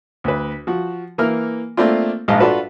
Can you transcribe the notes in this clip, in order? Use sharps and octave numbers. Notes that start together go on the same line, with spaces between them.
D2 B4
F3 F#4
E3 A#3 A#4 F6
A3 A#3 C4 D4 F4
A#1 G#2 D#5 F5 A5
D4 F4 F#4 A4 B4